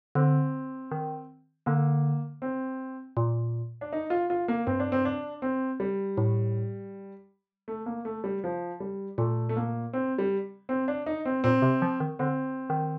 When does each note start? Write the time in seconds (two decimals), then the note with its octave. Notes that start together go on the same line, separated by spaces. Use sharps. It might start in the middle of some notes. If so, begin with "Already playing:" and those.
0.15 D3 C4
0.92 D#3
1.66 D3 A#3
2.42 C4
3.17 A#2
3.81 D4
3.93 D#4
4.10 F4
4.30 F4
4.48 A#3
4.67 G2 C4
4.80 D4
4.92 C4
5.05 D4
5.42 C4
5.80 G3
6.18 A2
7.68 A3
7.86 A#3
8.05 A3
8.24 G3
8.44 F3
8.80 G3
9.18 A#2 A3
9.49 A3
9.57 A#3
9.93 C4
10.18 G3
10.69 C4
10.88 D4
11.06 D#4
11.25 C4
11.44 A#2 C4
11.62 C3
11.82 F3
12.00 D#3
12.19 D3 C4
12.70 D#3